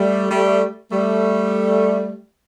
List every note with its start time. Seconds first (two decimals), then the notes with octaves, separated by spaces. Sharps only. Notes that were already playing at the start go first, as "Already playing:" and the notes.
Already playing: G3 A3
0.30 G3 A3
0.91 G3 A3